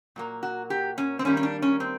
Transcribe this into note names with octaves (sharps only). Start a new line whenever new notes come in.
A#2 F#3 A#3
F#4
G4
C#4
C4
D#3 G3 A#3 C#4
C#4
D4
C#4
C4